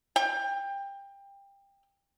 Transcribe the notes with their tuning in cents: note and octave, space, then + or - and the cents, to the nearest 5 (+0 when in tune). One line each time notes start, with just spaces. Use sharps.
G5 +20